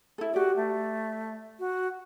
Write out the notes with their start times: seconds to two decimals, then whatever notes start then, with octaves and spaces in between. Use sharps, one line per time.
0.18 E4 A4
0.34 F#4 G4 D5
0.56 A3
1.59 F#4